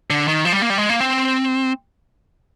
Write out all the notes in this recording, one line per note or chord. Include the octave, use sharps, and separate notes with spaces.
D3
D#3
F3
G3
A#3
G3
G#3
A#3
C4